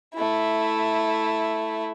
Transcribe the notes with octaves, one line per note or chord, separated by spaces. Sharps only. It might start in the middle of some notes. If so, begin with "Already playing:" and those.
A3 E4